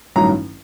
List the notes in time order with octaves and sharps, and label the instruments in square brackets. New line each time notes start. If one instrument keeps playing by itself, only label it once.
[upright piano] A1 G2 D#3 F#3 A#5